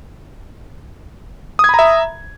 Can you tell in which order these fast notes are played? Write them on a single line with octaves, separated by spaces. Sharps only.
D#6 G#6 B5 A#5 E5